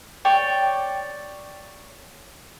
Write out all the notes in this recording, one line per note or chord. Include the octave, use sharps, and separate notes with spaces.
C#5 D5 G5